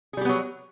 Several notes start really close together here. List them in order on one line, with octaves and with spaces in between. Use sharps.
G#4 G3 G4 B3 F#3